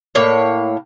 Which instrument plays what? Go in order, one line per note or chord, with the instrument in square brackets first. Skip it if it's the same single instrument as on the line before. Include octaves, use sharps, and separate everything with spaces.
[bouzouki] A2 A#3 C#5